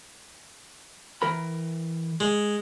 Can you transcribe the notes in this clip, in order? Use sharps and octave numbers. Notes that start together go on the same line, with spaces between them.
E3 A#4 B5
G#3